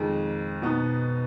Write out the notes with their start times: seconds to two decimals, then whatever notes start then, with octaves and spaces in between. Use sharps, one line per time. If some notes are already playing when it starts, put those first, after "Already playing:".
Already playing: F2 D#3 G#3
0.62 B2 B3 D#4